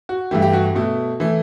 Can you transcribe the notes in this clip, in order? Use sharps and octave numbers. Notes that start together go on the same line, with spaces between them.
F#4
G2 E3 A3 G4
G4
F#4
B2 A3
E3 A3